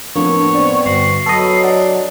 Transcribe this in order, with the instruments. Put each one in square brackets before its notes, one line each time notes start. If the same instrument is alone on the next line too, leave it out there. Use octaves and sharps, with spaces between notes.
[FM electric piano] F2 A2 A#3 [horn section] B3 [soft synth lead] D4 [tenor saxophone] C#5
[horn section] B3 C4 [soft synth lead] D5
[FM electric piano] G1 [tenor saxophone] F#4 [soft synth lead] C7
[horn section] F#3 [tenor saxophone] B3 [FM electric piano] A4 D#5
[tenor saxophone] D4 [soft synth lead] F#5